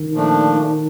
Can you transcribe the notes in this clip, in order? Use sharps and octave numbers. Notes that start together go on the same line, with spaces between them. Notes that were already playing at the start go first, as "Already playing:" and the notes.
Already playing: D#3
A#2 F3 A3 D4